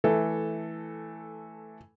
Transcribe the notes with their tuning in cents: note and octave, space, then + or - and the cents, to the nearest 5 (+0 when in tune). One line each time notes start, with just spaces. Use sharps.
E3 -5 A3 -10 A4 +0